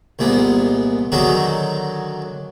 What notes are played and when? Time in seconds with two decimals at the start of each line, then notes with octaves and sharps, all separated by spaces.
0.19 C2 A#2 G#3 B3
1.12 D3 D#3 F#3 G#3 D#4 F#4